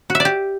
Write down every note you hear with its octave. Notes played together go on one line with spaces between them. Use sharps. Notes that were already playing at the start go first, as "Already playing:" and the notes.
F#4
E5
D5
G4